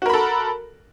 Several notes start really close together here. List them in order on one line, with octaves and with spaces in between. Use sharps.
F#4 A#4 B5 A4